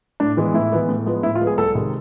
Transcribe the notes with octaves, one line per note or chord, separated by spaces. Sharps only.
A2 D4
E3 G#3 B3
A2 E4
E3 G#3 B3
A2
F3 G#3 B3
A2 E4
F4
F3 G#3 B3
G#4
C2 A4
C3 D#3 G#3